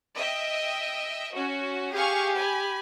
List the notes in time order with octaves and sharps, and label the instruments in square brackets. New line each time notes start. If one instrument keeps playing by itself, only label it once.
[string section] D#5 E5 G5
C#4 F#4
[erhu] G4 [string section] G#4 F5 C#6
[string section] G#5 B5